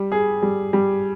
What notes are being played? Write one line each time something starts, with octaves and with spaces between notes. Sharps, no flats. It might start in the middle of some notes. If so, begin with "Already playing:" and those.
Already playing: G3
G#4
G3
G3